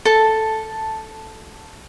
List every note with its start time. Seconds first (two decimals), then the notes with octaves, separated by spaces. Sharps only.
0.05 A4 A5